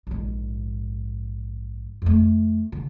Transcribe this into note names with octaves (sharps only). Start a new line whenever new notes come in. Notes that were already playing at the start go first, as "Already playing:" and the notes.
A#1 G#2
F2 A3
D3